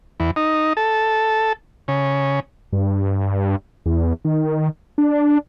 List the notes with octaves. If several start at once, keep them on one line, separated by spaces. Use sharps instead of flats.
E2
D#4
A4
C#3
G2
E2
D#3
D4